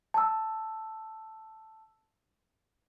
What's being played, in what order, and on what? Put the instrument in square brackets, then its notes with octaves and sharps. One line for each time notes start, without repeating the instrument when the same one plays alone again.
[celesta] A5 E6